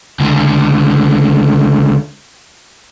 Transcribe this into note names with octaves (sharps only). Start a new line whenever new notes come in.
C#2 D3